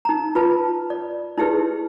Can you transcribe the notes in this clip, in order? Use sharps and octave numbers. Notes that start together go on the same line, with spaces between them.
D#4 A#5
F4 B4 A5
D5
D#4 E4 G4 G#4 B4